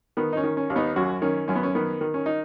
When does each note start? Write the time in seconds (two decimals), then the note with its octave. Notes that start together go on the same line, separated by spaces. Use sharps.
0.17 D#3 B3
0.33 D#4
0.37 C#4
0.43 D#3
0.57 C#4
0.70 D#2
0.76 B3 D#4
0.96 F#2 C#4 F#4
1.22 D#3 C#4
1.48 F#2 C#4
1.56 B3
1.63 C#4
1.75 D#3 B3
2.01 D#3
2.14 C#4
2.26 D#4